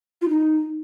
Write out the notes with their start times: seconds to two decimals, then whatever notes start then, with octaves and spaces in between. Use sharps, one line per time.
0.22 F4
0.29 D#4